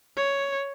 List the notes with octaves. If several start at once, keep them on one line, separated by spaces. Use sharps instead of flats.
C#5